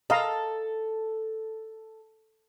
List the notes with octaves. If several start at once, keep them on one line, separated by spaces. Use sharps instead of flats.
A4 D#5 F5 A#5